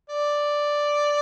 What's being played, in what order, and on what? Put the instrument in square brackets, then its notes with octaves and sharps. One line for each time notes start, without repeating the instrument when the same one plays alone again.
[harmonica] D5